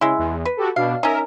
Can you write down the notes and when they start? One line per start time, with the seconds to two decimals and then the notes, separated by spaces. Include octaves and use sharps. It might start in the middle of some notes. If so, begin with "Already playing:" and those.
0.01 C#3 G#3 E4
0.18 E2
0.45 B4
0.57 F#4 G4 A4
0.76 B2 D4 F5
1.03 C#4 D#4 A#4 E5